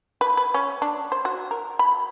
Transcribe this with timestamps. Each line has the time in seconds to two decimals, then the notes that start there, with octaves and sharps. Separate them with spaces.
0.21 B4
0.37 B4
0.54 C#4
0.82 D4
1.12 C5
1.25 F#4
1.51 A#4
1.79 B5